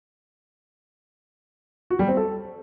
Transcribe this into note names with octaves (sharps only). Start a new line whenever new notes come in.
F#4
G3
C4
A4